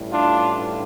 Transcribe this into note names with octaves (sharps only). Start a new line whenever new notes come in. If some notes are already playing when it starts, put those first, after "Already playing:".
Already playing: A1 A2 E3 G3
D4 F4